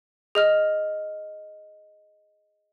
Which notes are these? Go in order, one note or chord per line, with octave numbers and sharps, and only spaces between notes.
G#4 D#5 F6